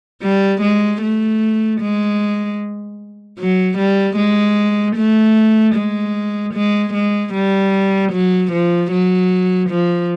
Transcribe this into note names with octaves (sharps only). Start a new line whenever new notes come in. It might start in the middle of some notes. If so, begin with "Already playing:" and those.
G3
G#3
A3
G#3
F#3
G3
G#3
A3
G#3
G#3
G#3
G3
F#3
F3
F#3
F3